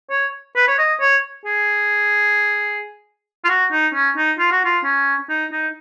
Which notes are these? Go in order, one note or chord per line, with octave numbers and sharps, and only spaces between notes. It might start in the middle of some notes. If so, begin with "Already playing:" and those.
C#5
B4
C#5
D#5
C#5
G#4
F4
F#4
D#4
C#4
D#4
F4
F#4
F4
C#4
D#4
D#4